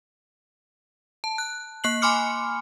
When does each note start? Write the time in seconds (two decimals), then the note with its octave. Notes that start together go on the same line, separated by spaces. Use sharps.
1.24 A5
1.38 F#6
1.84 A#3 F#6 C7 F#7
2.02 G#5 B5 C6 D6 F6 C#7